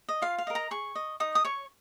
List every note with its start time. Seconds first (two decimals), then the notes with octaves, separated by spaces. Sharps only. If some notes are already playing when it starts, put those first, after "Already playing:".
0.09 D#5
0.22 F4 F5
0.38 F5
0.47 A#4 D#5
0.55 A#5
0.71 G#4 C#6
0.95 D#5
1.20 D#4 D#6
1.35 D#6
1.45 C#5 C#6